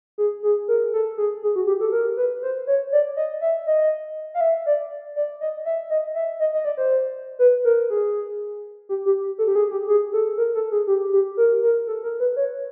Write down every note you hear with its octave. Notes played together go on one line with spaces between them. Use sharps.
G#4
G#4
A#4
A4
G#4
G#4
F#4
G4
A4
A#4
B4
C5
C#5
D5
D#5
E5
D#5
F5
E5
D5
D5
D#5
E5
D#5
E5
D#5
D#5
D5
C5
B4
A#4
G#4
G4
G4
A4
G4
G#4
G4
G#4
A4
A#4
A4
G#4
G4
G4
A#4
A#4
A4
A#4
B4
C#5